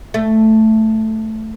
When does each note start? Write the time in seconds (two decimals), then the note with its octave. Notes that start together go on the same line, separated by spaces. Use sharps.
0.14 A3